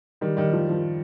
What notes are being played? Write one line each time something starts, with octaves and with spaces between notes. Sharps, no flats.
D#3 G3
D#3 G3
F3
F3